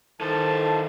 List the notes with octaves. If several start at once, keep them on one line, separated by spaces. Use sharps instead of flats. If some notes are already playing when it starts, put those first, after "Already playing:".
D#3 E3 A4 C5 A5